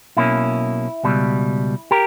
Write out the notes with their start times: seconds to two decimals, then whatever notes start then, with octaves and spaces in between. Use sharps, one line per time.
0.17 B1 B2 A#3 C#4 E4
1.04 C#2 B2 G3
1.91 G4 A#4